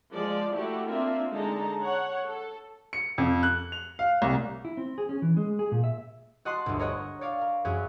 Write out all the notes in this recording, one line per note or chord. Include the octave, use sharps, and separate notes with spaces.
F3 G#3 D5
A3 E4 F#4 G4
A#3 C4 D4 F4 E5
D3 G#3 D#4 A5 A#5
C#5 F#5
A4
C#7
F2
F#6
F7
F5
C2
E4
C4
G#4
C#4
E3
G#3
G#4
A#2
E5
F#4 D#5 F#5 A5 C6 F#6
G1 D2
A#4 C#5 D#5 F#5
C#5 D5 F5
A#4
F#2 C#4 F#4 G#4